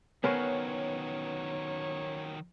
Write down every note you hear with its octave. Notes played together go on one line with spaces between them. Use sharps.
D#3 F#3 B3 C#4 A#4 C5 C#5